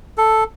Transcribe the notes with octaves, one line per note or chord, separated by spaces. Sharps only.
A4